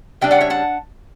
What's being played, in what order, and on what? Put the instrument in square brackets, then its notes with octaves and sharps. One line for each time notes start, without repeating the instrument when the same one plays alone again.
[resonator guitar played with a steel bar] C#3 G3 D4 E5 G5
D5 F#5
C#5 E5
F#5 A5